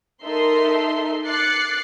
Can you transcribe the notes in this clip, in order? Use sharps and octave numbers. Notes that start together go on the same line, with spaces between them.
D#4 A4 A#4 E5 C6
D6 F#6 A6 C7 C#7